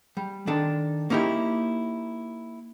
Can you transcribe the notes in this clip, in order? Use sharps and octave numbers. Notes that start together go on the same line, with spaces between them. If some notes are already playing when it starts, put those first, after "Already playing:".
G3
D#3 D4 A4
A#3 C#4 D#4 E4 G4